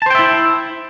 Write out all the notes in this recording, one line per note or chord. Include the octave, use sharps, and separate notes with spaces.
E4 C5 E5 G5 A5